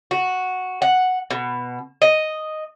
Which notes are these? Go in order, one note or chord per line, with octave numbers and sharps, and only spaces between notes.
F#4
F#5
B2
D#5